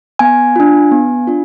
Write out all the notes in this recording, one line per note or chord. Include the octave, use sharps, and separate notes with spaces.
B3 G#5
D4 F4
B3
D4 F4